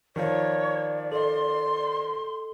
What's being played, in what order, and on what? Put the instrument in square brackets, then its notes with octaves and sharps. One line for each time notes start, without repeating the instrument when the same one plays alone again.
[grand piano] D#3 F3 [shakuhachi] C#5 [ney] D5
[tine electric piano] A4 D#5 [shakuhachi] C6